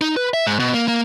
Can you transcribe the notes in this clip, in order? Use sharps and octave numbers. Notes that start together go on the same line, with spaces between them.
D#4
B4
E5
G#2
B2
A#3
A#3